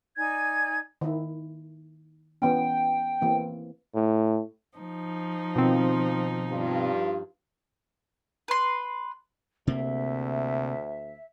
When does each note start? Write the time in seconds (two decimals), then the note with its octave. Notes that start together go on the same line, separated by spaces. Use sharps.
0.17 D#4 D5 G#5 G#6
1.01 D#3 E4
2.42 E3 B3 C#4 G5
3.22 E3 A#3 C4
3.95 A2
4.78 F3 D#4
5.56 B2 D#3 C4 F4
6.50 G2 F4
8.48 B4 C6
9.67 D2 C3 A#3 E5